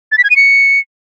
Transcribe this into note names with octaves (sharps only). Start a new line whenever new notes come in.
A6
B6
G#6
D#7
C#7